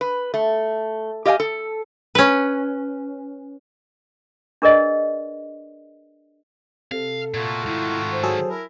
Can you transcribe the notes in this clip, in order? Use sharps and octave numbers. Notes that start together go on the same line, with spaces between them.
B4
A3
G4 D#5 F5 G5 G#5
A4
C#4 B4
D4 G#4 A#4 B4 D5 D#5
C3 A4 F5
A#2 A3 F4 F#4
G#2 D#3 E4
C5
F#3 G#4 A4
E4 A#4